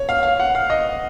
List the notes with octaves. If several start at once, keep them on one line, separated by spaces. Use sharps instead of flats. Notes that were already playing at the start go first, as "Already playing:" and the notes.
Already playing: C#5
F5
F5
F#5
F5
D#5